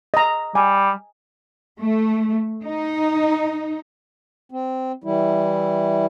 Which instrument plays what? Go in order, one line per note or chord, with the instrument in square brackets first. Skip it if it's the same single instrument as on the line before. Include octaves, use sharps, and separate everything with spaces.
[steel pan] D#5 A#5
[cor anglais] G3 [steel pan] G#5
[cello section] A3
D#4
[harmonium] C4
E3 G3 E4